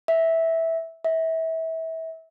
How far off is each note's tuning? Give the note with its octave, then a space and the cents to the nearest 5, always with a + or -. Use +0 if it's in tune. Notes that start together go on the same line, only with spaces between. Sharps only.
E5 -10
E5 -25